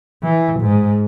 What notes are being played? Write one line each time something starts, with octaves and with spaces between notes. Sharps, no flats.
E3
G#2